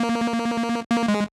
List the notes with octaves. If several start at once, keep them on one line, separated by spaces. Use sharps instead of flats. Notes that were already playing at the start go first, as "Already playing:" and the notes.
Already playing: A#3
A#3
G#3